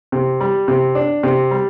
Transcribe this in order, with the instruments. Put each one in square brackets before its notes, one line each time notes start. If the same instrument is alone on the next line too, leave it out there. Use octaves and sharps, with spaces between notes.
[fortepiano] C3
G3
C3
D4
C3
G3